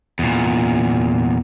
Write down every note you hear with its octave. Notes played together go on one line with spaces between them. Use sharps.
E2 A#2